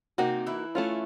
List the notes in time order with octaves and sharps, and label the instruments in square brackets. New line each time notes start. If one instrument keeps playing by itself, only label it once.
[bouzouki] C3 C4 [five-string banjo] A#3 D#4 F#4
[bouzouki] E3 E4
[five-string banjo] A3 C#4 F4